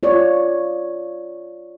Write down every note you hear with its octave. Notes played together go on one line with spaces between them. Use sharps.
F4 C#5 D5